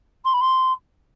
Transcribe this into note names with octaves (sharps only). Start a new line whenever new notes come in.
C6
B5
C6